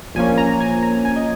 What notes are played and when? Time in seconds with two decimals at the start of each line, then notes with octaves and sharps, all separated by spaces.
0.15 A#1 A#2 F3 A#3 C#4 G#5
0.38 A#5
0.61 G#5
0.83 A#5
1.05 G#5
1.16 D#5